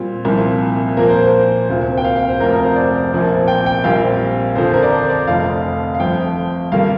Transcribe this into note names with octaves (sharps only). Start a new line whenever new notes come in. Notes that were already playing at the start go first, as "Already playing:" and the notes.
Already playing: A#2 G3 C4 F4
C2 A#2 F3 C4
A#2 F3 A#3 A#4
C5
C5
D2 C3 A#3 F4
G5
F5
F5
C5
F1 F2 C3 A#4
A#4
C5
D5
A#1 A#2 F3 C4
G5
G5
A#1 A#2 G3 C4 F5
F2 D3 F3 C5
A#4
D5
C5
D5
F1 F2 D3 F5
F5
G1 F2 F3 G5
G2 D3 G3 A#3 F5